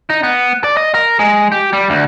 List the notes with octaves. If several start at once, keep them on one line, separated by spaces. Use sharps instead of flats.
D#4
B3
D5
D#5
A#4
G#3
G4
G3
D2